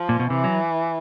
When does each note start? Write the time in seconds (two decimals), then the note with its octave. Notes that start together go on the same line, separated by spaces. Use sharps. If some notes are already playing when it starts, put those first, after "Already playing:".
Already playing: F3
0.09 A#2
0.19 B2
0.30 C3 E3
0.44 F#3